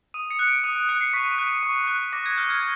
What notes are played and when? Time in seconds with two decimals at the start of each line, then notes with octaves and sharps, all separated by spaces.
0.14 D#6 D#7
0.31 C#7
0.39 F#6
0.47 D7
0.64 D#6 D#7
0.76 D#7
0.89 F#6 C#7
1.01 C7
1.13 C#6 B6
1.39 F#6
1.63 C#6
1.87 F#6
2.13 D6 A#6
2.26 G#6
2.38 F6 G6
2.50 G#6